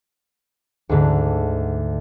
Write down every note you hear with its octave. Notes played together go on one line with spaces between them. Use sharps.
D2 G#2 D3